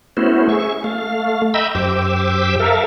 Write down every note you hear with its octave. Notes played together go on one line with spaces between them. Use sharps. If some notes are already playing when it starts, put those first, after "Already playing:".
A3 B3 C#4 E4 F#4 C5
G#4 E5 C#6
A3 F5
D#5 E5 G5 A#5 B5 E6
F#2 G4 C5 D6 E6
A4 A#4 E5 F5